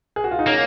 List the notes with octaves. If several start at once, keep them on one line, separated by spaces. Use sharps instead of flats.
G#4
F#4
F4
D#4
A#3 C#4